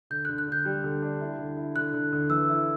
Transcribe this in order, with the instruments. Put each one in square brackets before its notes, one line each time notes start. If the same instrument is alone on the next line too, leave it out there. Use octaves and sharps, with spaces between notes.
[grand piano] D3 [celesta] G6
[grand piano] D3 [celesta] F#6
[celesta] F#6
[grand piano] D3 [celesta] G6
[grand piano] G3
D3
D4
E4
D3
E4
[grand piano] D3 [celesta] F#6
[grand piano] D3
D3
[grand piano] E3 [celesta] E6
[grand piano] E4